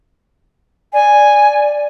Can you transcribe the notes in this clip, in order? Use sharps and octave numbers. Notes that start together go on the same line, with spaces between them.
D5 G#5